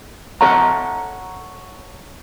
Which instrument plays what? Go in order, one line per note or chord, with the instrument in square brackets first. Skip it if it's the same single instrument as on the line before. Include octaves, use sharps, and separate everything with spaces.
[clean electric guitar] A4 C#5 F#5 A#5